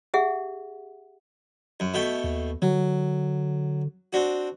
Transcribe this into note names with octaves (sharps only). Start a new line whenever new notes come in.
G4 G#4 E5 F#5
F#2
B2 A3 G5
D#2
D3 F#3
C4 D4 F#4